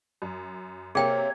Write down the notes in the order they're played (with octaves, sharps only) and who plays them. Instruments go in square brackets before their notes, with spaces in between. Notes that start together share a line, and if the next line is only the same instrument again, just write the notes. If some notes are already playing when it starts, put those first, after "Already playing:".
[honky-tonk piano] F#2
[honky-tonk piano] C3 A#3 [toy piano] G#4 G5 [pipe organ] C#5